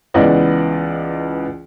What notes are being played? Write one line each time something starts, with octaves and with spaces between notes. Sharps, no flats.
C#2 E3 B3 D5 D#5 F#5